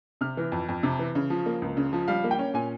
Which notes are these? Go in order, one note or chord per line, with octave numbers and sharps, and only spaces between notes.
C3 F6
E3
F2
F2
C3
E3
C#3
F3
A#3
C#2
C#3
F3
G3 F5
A#3
G5
C#4
A#2 G#5